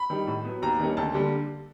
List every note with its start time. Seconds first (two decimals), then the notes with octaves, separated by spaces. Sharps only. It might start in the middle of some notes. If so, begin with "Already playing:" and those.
Already playing: B5
0.10 D#3 G3
0.27 A2
0.44 F#3 B3
0.62 D#2 A#5
0.80 D#3 G3 A#3 C#4
0.97 D2 A5
1.14 D3 G3 A#3